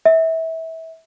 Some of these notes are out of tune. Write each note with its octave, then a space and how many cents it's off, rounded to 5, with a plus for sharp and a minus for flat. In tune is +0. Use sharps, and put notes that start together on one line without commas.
E5 -25